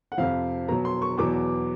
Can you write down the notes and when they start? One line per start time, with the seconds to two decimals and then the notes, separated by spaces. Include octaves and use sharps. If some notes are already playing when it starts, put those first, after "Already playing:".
0.12 F#5
0.18 F2 C3 F3 F5
0.68 B2 F#3 A#5
0.85 C6
1.02 C#6
1.18 E2 B2 F#3 D6